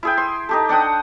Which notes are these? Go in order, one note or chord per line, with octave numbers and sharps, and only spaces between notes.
E4 G#4 G5
C6
D#4 G4 A4
D4 F#5 G5 D#6